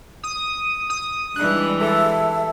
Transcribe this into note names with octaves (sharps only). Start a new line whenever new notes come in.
D#6
D#6
E3 G3 G#3 D4 F#6
A4 E5